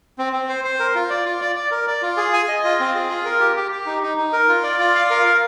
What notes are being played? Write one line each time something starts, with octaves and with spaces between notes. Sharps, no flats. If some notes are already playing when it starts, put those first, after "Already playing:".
C4
C4
C5
C5
A#4
F4
D5
F4
D5
D5
A#4
D5
F4
G#4
G#5
D#5
F4
C4
G#4
F4
A#4
G4
G4
G4
D#4
D#4
D#4
A#4
F4
D5
F4
F5
A#4
A#4